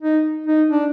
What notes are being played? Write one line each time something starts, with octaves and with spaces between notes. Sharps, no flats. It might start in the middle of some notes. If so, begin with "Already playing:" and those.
D#4
D#4
D4